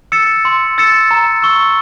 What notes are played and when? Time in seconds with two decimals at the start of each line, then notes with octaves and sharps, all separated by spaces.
0.12 E6 A6 C#7 E7
0.45 C6
0.78 E6 A6 C#7 E7
1.11 A#5
1.42 C#6 E6